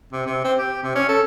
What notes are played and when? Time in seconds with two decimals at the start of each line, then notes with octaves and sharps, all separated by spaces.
0.13 C3
0.26 C3
0.44 C4
0.59 G4
0.83 C3
0.95 C#4
1.08 A4